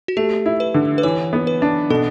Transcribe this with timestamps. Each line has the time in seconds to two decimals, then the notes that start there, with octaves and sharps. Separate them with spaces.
0.08 F#4
0.17 A3 G4
0.46 E4
0.60 B4
0.74 D3
0.98 B4
1.03 E3 C#5
1.33 B3
1.47 B4
1.62 D4
1.90 B2 A4